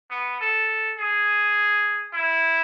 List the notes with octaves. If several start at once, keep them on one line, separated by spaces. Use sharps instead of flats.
B3
A4
G#4
E4